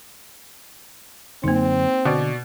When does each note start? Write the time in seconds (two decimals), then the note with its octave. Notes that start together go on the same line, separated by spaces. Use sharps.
1.44 F#2 D3 A#3 C4 D#4
2.05 B2 D3 D5